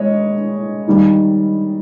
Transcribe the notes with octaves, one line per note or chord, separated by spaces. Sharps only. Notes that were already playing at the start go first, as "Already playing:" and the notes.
Already playing: G#3 C#5 D#5
D#3 G3